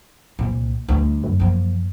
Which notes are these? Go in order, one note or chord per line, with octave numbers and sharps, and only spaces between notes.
C2 A#2
D2 G3
F#2
F3 A#3